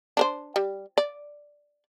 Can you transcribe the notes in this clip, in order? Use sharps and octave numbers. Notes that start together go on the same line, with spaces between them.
D4 A#4 C5
G3
D5